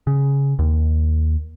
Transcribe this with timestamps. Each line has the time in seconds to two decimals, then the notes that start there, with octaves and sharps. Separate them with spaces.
0.07 C#3
0.59 D#2